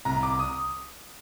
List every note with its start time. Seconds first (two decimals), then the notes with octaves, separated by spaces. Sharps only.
0.05 C2 A#5
0.23 D6
0.39 D#6